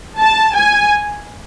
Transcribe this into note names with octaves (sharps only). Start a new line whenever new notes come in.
A5
G#5